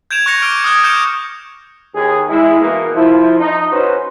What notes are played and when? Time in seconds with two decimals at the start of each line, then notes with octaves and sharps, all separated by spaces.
0.11 G6 G#6 D7 E7 F7
0.26 C#6 F#6 A#6 C#7 F7
0.42 D6 F6 D7
0.64 D#6 F6 F#6 G#6
0.83 D6 F6 G6 C#7 D7 E7
1.95 D#2 G#4
2.29 G#3 E4
2.61 B2 E3 A#3
2.95 F3 E4
3.39 D#4
3.72 C#4 F#4 B4 C5